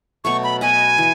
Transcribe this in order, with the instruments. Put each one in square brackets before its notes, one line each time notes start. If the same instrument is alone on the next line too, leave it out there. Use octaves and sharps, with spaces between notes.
[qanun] B2 F#3 A3 [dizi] C#6
[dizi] B5
[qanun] B3 F#4 B4 D#5 [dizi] G#5
[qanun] E3